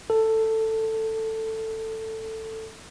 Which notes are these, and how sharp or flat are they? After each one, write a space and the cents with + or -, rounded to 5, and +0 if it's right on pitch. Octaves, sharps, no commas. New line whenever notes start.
A4 +10